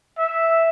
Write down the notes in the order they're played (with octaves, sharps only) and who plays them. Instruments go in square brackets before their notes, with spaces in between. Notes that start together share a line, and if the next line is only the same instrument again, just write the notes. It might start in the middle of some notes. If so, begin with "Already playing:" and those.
[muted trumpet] E5